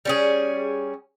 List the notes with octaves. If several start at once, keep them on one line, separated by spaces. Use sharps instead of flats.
G3 C#4 G#4